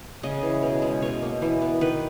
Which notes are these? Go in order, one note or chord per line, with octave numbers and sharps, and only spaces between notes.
C#3 D#5
E3
B2
G#3
B2 C#5
A#3
E3
B3
D#3 B4